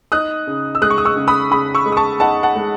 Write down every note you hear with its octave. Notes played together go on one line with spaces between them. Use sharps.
D#4 D#6 F#6
C#3
E6
G#3 D#6 F#6
C#6
D#6
C#6 E6
C#3
B5 D#6
C#3 B5 D#6
C#6 E6
G#3
D#6
A5 C#6
D#4 F#5 A5
F#5 A5
G#3